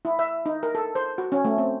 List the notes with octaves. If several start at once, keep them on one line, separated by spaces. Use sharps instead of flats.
E4
E5
D#4
A#4
A4
C5
F#4
C#4
A3
C4